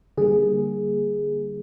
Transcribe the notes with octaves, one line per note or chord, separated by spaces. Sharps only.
D3 G3 A#3 G#4